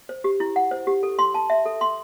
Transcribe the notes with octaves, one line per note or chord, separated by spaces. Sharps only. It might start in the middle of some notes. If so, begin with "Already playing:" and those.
C5
G4
E4
F#5
C5
G4
A4
C6
A5
E5
A4
C6